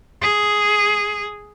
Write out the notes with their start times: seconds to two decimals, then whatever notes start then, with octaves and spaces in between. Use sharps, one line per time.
0.21 G#4